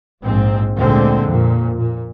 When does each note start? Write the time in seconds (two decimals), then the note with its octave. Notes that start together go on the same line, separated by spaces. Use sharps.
0.22 A#1 G#2 C4
0.76 D2 A#2 D3 G#3 C4
1.25 F2 A#2
1.77 A#2